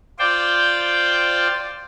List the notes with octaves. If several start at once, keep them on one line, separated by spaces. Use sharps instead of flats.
F4 C5 D5 G5